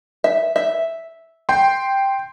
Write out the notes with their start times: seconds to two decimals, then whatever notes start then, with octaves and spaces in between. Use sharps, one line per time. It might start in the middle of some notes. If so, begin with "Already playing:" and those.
0.24 E5
0.56 E5
1.49 G5 C6